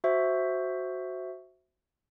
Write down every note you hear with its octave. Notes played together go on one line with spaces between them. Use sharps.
F#4 C5 E5